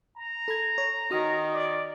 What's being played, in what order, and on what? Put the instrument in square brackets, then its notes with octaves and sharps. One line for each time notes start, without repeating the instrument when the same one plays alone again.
[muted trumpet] A#5
[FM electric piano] A4 B5 G#6
C#5
[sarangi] D#3 [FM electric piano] F#4 D#6
[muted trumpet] D5